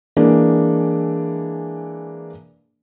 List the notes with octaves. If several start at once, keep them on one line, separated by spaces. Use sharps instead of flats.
E3 G#3 A#3 D4